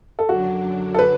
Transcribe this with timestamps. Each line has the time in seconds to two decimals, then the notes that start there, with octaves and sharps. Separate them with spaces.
0.19 A4
0.29 F#2 D3 F#3 D4 F#4
0.94 A4
0.99 B4